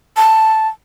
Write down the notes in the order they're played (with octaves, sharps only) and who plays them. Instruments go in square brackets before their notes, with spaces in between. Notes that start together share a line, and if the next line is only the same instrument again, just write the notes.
[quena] A5